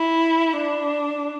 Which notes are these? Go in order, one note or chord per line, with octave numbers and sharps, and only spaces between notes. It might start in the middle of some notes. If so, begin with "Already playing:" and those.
Already playing: E4
D4